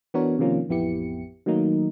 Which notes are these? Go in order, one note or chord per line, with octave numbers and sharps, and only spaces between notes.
E3 B3 D4 F#4 A#4 C#5
C3 D#3 F3 A#3 C#4 F4
A1 F2 B3 E4 G4 C#7
D#3 F#3 A3 A#3 D#4